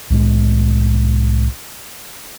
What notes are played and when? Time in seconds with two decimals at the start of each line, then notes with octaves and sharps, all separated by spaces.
0.10 C2 A2 G#3